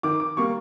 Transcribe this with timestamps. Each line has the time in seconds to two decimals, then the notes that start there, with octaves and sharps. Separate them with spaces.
0.03 D#3 D6
0.20 D6
0.37 G3 A#3 C#6